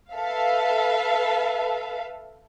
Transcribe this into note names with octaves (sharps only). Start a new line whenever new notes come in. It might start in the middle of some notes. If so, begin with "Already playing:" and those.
A4 B4 E5 F5